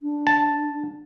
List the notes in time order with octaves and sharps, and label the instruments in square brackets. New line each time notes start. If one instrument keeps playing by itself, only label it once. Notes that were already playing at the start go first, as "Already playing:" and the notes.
[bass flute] D4
[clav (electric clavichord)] A5